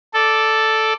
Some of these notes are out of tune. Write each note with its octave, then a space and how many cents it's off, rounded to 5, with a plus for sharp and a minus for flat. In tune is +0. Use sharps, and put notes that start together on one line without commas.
A4 +0 D5 +0